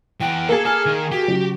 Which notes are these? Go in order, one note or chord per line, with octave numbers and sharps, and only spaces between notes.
E3 F#5 G5
A#3 G#4 A4
A4 G#5 F6
D#3
F#4 G4
C#3 F#3